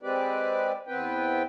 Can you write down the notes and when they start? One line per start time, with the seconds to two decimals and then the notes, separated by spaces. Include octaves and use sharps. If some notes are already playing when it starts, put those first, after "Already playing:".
0.02 G#3 C4 G4 B4 D5
0.87 E2 B3 C4 B4 G5